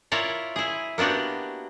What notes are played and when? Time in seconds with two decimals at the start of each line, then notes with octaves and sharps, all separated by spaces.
0.12 E4 F4 A#4 C#5 D5
0.56 E4 G#4
0.98 A#3 B3 D4 F#4 G4